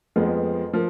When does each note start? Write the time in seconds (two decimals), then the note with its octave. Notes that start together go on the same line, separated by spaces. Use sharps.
0.16 F2 F3 G#3 B3
0.73 F3 A#3